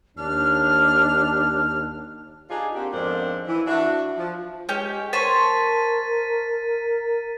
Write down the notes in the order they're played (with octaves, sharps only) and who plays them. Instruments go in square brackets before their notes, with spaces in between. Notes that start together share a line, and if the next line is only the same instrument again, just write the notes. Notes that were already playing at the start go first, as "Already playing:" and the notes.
[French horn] D#2 [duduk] D4 [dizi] F6
[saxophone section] D4 D#4 F4 G4 G#4
A#3 C4 D4 F#4 G4
F2 G#2 B3 D4 A#4 C5
E3
D4 F#4 E5
F3
[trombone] G#3 [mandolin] C#4 G4 G5
[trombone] A#4 [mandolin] C5 C#5 A5 [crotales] A6 B6 D#7